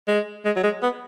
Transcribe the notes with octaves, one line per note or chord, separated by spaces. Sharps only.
G#3
G#3
F#3
G#3
B3